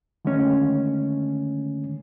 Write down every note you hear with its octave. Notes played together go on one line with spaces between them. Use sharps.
D3 D#3 G#3 A3 C#4